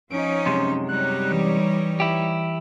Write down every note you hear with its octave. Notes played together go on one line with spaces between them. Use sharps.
F3 C#4 D#4 D7
F#2 C3 G#3 C6
G3 D#4 C#5 F#6
E3
E4 G4